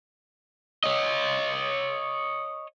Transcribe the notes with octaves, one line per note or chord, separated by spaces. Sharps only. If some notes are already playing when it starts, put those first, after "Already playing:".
C#5 D#5